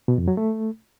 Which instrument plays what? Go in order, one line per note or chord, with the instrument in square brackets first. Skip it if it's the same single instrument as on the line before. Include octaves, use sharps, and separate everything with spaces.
[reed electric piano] B2
F2
F#3
A3